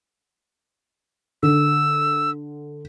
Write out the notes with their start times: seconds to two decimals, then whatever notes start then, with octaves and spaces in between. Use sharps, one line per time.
1.43 D3 E6